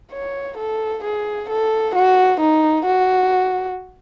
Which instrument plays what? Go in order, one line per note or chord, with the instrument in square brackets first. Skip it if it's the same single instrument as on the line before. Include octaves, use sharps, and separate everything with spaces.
[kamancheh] C#5
A4
G#4
A4
F#4
D#4
F#4